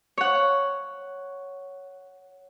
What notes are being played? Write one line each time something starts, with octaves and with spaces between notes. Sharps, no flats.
C#5 F#5